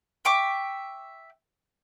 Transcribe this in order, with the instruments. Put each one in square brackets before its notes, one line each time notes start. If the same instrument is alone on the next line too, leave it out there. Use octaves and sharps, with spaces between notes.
[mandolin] E5 G5 C#6 D6